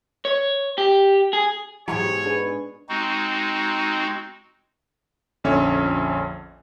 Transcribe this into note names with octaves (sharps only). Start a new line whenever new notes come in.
C#5
G4
G#4
G#2 B2 E3 F#3 G#3 G4 C#5
D4 G#4 B4
G#3 C4 D#4 F#4
A#1 F2 D3 C#4 C#5 E5